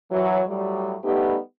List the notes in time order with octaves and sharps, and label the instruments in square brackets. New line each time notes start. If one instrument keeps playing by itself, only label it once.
[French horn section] E3 F#3
A2 F#3 G3
G3 A3 B3 D#4 G4